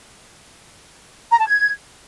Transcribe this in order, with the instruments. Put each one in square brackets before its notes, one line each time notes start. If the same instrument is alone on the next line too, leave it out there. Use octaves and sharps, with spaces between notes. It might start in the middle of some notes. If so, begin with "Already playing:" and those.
[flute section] A#5
A5
G#6